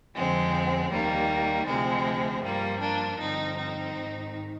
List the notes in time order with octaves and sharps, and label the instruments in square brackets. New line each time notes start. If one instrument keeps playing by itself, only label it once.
[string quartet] F2 D3 F3 G#3 C4
D#2 D#3 G3 A#3
D2 C3 F3 G#3 C4
G2 F3 G3 A#3
A#3 D4
G2 D3 F3 C4 D#4
C4 D#4
G#2 D#3